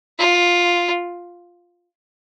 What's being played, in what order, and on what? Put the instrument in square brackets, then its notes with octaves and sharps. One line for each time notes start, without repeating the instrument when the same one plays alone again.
[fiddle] F4